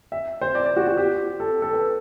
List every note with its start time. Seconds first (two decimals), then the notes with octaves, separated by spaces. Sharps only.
0.12 E5
0.41 C5
0.55 D5
0.65 D5
0.76 F#4
0.87 F#4
0.97 G4
1.40 A4
1.62 A4
1.73 B4